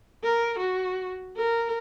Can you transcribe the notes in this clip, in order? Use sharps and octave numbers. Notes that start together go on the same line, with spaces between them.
A#4
F#4
A#4